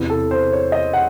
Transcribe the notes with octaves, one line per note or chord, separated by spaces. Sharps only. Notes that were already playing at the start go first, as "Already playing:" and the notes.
Already playing: E2 C3 E3
A4
C5
C#5
D#5
F#5